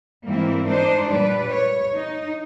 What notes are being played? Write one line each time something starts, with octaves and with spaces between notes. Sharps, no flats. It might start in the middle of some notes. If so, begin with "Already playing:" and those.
G#2 E3 G3 A#3 C4 E4
D4 D#4 C5
A#2 G3 B4 D5
C#5
D#4